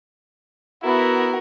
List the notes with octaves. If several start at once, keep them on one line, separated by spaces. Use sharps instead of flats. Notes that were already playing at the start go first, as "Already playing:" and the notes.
B3 E4 F#4 A#4